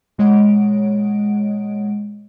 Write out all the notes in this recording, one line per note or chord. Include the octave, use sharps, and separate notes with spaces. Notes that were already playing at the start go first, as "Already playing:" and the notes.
A#2 G#3 C#5 D#5 F#5 D7